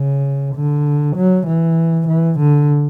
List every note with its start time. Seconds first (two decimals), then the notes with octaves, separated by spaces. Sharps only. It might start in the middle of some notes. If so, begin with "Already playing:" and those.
Already playing: C#3
0.55 D3
1.16 F#3
1.47 E3
2.08 E3
2.39 D3